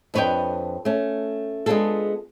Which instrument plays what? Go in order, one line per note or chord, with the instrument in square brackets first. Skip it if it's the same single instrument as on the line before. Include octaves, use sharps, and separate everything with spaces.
[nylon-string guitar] F2 D4 B4 C#5 D#5 G5
A3 C#4
G#3 B3 D4 F4 G#4 A4